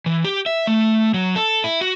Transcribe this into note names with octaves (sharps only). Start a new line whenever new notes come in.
E3
G4
E5
A3
F#3
A4
E4
F#4